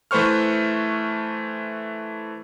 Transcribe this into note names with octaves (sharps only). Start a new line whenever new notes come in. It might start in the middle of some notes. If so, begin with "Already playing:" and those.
E3 A3 B4 C5 C#6 F6